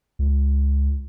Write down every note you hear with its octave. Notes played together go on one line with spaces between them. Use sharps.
C#2